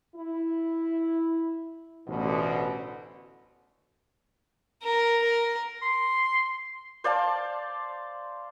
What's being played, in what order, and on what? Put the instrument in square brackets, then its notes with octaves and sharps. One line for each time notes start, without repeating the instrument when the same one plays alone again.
[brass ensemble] E4
A1 D2 B2
[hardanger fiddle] A#4
A#4
[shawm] C6
[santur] C5 D5 F5 A5